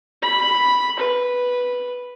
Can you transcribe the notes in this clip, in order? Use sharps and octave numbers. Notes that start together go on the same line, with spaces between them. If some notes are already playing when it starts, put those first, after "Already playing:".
B5
B4